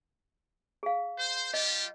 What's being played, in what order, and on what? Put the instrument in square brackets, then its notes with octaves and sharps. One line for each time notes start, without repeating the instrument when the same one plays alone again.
[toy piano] G#4 F5
[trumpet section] C5
[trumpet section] G3 F4 G4 [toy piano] D#5